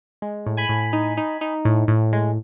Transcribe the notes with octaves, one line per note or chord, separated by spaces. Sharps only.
G#3
A2
G#5 B5
A2
D#4
D#4
D#4
A2
A2
G#3